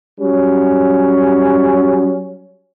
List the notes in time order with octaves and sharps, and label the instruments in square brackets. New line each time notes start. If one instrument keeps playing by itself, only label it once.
[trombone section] F#3 G3 C#4